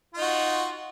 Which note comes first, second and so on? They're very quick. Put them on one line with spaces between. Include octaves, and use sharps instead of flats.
F4 D#4 F#4